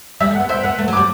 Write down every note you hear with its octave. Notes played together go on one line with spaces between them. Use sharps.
G3 E5
A3
F#5
B3
C4 E5
B3 F#5
A3
F#3
D6
G3